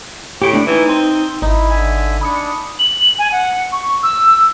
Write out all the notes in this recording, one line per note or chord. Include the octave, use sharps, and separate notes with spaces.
A2 G4 G5
A3 D4
E3 D#4
C4
G#1 D#4 E4
D3 E5 G#5
D4 B5 D#6 C#7
F#7
G#5
F#5
C#6
E6